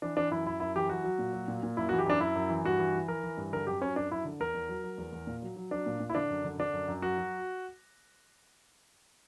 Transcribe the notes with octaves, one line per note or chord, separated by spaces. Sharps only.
E3 D4
E3 D4
F#2 E4
F#2 E4
F#2 E4
E3 G4
F#3 F#4
F#3
A#2
F#3
A#2
A#2
F#2 E4
F#4
E3
G4
F#2 D4
F#2 E4
F#2
E3
G2 F#4
E3
E3
E3 A#4
E3
G2
D3 A#4
F#2 G4
F#3 C#4
F#2 D4
F#2 E4
D3
E2 A#4
E2
F#3
F#3
E2
E2
A#2
F#3
F#3
F#3 D4
A#2
A#2
E4
D3 D4
F#2
D3
D3 D4
F#2
F#2
F#3 F#4
F#3